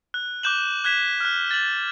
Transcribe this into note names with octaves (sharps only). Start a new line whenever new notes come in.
F#6
D6 F#6 G6 E7 F#7
F#6 G#6 B6 E7
F6 F#6
A6 F#7